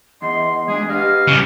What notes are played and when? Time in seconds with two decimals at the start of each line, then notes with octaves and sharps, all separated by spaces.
0.22 E2 D#5 C6
0.68 G#3 D4 G#4
0.90 G4 B4 D#5 F5
1.28 C#3 E3 F#3 G3